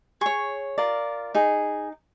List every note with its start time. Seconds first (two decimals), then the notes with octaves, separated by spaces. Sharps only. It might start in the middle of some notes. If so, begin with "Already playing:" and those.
0.21 G#4 C#5 C#6
0.78 F4 A#4 D5
1.34 D#4 G#4